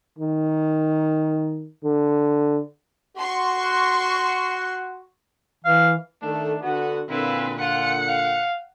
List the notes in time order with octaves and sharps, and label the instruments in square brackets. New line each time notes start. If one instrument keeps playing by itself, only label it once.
[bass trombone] D#3
D3
[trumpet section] F#4 [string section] C6 C#6
[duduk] E3 [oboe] F5
[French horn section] D#3 A3 [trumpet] D4
[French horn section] D3 F#4 [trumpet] B3
[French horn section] A#2 D3 [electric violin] C4 B4 [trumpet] E4
[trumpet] F4 [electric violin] F#5 C#7
[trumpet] F5